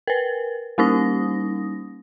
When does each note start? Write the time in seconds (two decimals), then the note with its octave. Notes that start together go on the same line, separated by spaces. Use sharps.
0.07 A#4 B4
0.78 G3 A#3 C#4 D#4 D#6 A#6